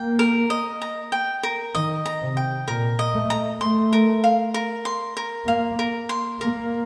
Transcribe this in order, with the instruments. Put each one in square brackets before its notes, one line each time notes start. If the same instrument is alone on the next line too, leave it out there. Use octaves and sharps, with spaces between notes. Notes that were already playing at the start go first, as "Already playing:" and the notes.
Already playing: [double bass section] A#3 [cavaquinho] G5
[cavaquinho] A#4
D#5
A#5
G5
A#4
[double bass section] D#3 [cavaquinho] D#5
[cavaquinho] A#5
[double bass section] C3
[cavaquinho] G5
[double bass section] A#2 [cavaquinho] A#4
[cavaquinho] D#5
[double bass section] A3
[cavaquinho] A#5
[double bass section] A3 [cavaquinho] C6
[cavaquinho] A#4
F5
A#4
C6
A#4
[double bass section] A#3 [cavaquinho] F5
[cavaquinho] A#4
C6
[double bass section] A#3 [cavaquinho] A#4